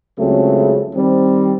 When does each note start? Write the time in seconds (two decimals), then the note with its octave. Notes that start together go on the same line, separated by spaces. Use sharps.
0.18 C#2 C#3 F#3 A3 C4
0.93 D#3 G3 C4